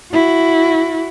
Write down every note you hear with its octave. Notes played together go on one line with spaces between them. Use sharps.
E4 F#4